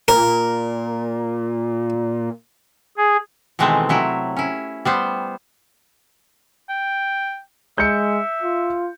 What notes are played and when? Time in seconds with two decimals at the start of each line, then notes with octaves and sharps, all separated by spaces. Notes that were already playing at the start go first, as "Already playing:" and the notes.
0.08 A#2 A#4
2.97 G#4
3.59 B2 D#3 E3 G#3 A3 C4
3.89 C3 F#3 E4
4.37 C#4 E4
4.85 G3 B3 C5
6.69 G5
7.78 G#3 E5 G6 C#7
8.42 F4